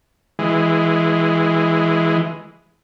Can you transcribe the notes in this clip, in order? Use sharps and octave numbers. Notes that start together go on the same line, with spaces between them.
E3 G#3